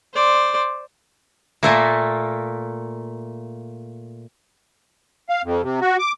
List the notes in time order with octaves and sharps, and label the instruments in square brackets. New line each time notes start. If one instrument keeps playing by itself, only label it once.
[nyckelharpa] C5 D5
[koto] A#2 A3 A#3
[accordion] F5
F2
C3
F#4
D6